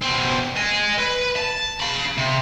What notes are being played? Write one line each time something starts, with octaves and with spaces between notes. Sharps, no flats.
B2 C4
D#5 G#5
B4
A5
F5 B5
C3